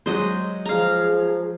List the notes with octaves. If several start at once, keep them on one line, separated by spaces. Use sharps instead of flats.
F#3 G#3 C5 D#5
F3 G#4 F5 A#5